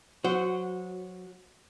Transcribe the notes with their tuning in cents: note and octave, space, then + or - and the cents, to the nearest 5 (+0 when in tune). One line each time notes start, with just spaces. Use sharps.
F#3 -20 F#4 +0 C5 -15